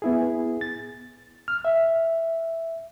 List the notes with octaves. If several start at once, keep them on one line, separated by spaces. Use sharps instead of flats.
B3 E4 G#4
A6
F6
E5